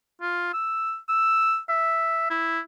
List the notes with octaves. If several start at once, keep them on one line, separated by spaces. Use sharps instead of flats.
F4
E6
E6
E5
E4